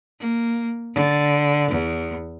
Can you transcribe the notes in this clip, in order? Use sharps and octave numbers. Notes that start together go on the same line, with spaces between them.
A#3
D3
E2